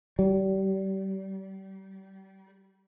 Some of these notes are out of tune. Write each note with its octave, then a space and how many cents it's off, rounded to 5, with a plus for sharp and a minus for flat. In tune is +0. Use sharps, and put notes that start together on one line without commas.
G3 -30